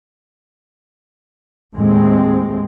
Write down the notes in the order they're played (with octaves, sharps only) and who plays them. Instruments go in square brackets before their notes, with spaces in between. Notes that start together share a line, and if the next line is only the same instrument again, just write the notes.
[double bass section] D#2 A2 G#3 C4